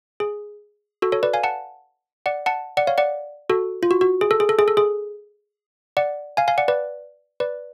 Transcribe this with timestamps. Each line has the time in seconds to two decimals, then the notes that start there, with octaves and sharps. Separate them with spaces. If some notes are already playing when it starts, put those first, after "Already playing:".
0.20 G#4
1.02 F#4 A4
1.12 A4 C#5
1.23 B4 D5
1.33 F5 G#5
1.43 F#5 A5
2.26 D5 F#5
2.46 F#5 A5
2.77 D5 F#5
2.87 C#5 F5
2.98 D5 F#5
3.50 F#4 A4
3.83 F4
3.91 F#4
4.01 F#4
4.21 G#4
4.31 A4
4.40 G#4
4.49 A4
4.59 G#4
4.68 A4
4.77 G#4
5.97 D5 F#5
6.37 F5 G#5
6.48 F5 G#5
6.58 D5 F#5
6.68 B4 D5
7.40 B4 D5